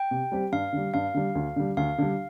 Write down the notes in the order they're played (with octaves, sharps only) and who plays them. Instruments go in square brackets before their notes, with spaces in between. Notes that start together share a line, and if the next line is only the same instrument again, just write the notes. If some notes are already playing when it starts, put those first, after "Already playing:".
Already playing: [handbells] G5
[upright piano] C3
G3 C4 G4
[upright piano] G2 [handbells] F5
[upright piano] D3 G3
[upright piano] G2 [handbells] F5
[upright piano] D3 G3
D2
D3 G3
[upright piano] D2 [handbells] F5
[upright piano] D3 G3